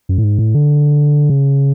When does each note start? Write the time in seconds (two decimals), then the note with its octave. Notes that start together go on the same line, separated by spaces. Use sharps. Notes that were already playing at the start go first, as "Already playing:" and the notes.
0.09 F#2
0.18 A2
0.24 G#2
0.38 A2
0.55 D3
1.29 C#3